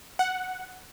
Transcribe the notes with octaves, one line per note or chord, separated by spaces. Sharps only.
F#5